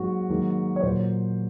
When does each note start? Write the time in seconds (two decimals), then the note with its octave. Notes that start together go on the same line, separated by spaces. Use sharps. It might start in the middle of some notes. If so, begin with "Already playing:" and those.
Already playing: G#2 F#3 A#3 F#4
0.29 G#2 D#3 F#3 A#3
0.76 C#5
0.83 A#2 F#3 A#3 C5